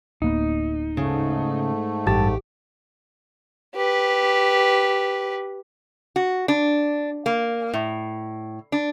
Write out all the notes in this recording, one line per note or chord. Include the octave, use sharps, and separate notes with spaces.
D1 A#3 B3 D#4
G#2 C#3 A3
A1 G2 G4 A5
G4 B4
F#4
D4
A#3
A2
D4